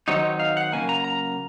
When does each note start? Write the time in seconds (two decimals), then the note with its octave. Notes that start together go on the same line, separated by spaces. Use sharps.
0.08 D#3 F#3 C4 D#4 C#5
0.40 F5
0.57 F#5
0.72 C#3 F#3 A#3 G#5
0.89 A#5
1.04 A#5